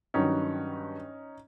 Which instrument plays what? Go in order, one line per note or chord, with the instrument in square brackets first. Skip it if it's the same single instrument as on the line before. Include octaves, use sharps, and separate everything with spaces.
[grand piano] G2 D#3 F#3 C#4 D#4